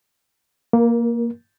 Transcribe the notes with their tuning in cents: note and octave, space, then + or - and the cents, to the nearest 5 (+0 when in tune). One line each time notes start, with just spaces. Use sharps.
A#3 +0 A#4 +30